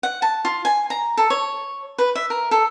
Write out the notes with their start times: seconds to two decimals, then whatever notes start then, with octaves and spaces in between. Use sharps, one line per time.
0.03 F#5
0.22 A5
0.45 F4
0.65 G#5
0.90 A#5
1.17 A4
1.30 C#5
1.98 B4
2.15 E5
2.30 A#4
2.51 A4